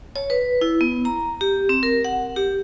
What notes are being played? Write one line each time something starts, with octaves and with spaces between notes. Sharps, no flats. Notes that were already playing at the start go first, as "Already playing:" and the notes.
C#5
B4
E4
B3
A#5
G4
C4
A#4
F#5
G4